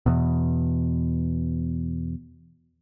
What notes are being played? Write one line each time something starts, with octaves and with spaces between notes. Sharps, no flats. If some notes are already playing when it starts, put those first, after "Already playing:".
E2 B2